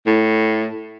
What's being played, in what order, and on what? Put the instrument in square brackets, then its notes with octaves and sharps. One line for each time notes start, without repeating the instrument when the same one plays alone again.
[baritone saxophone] A2